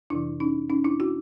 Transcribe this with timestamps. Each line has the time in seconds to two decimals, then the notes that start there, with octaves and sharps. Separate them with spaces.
0.10 F2 C3 E3 D4 E4
0.40 C#4 D#4
0.70 C#4 D#4
0.84 D4 E4
1.00 E4 F#4